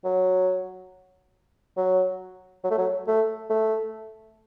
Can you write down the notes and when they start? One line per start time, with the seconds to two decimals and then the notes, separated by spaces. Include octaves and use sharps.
0.04 F#3
1.77 F#3
2.64 F#3
2.71 A3
2.78 F#3
3.08 A3
3.50 A3